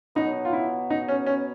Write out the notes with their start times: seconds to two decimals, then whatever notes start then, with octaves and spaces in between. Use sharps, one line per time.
0.15 B2 F#3 B3 D#4
0.45 F4
0.53 E4
0.90 D#4
1.08 C#4
1.26 C#4